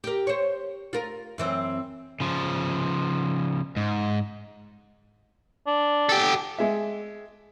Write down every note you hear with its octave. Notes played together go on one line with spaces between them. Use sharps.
G4 A#4
C5 C#5
F4 A#4
F#2 E3 C4
C#3 F3
G#2
D4
G4 A4
G#3 E5